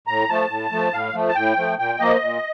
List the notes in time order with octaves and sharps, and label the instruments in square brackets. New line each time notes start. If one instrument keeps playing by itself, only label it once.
[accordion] A2 A#5
F3 A3 A5
A2
F3 A3
A2 F5
F3 A3
A5
A2 G5
F3 A3
A#2 G5
F3 A#3 D#5
A#2